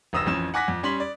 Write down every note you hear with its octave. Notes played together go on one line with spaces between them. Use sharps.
F1 D2 D#6 E6 A#6 E7
A1 F2 C#4 E7
F#5 G#5 D6 F#6 A#6 B6
F2
G3 C#4 C6 B6 F#7
D5